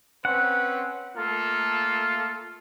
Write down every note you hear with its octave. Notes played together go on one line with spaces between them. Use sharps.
C4 C#4 B4 F#5
A3 A#3 F4 A4